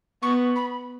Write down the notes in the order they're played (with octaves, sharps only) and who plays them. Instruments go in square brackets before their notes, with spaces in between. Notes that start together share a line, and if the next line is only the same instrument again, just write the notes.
[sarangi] B3 [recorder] C#6
[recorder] B5